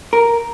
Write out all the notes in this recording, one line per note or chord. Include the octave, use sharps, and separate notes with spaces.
A#4